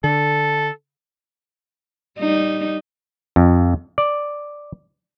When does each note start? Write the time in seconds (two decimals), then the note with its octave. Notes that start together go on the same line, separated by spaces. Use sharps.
0.04 D3 A4
2.19 G3 D#4
3.36 F2
3.98 D5